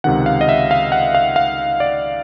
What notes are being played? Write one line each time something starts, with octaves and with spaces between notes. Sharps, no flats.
C#2 C3 D#3 F#5
F5
D#5
E5
F5
F#5
F5
F5
D5